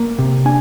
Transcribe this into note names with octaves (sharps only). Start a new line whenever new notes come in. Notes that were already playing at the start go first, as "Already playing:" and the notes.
Already playing: A#3
C3
D4 G#5